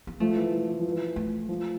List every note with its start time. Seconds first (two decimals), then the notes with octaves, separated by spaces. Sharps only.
0.07 A#3
0.20 F3 A3
0.37 E3
0.52 E3
0.69 E3
0.80 F3
0.92 E3
1.16 A3
1.49 F3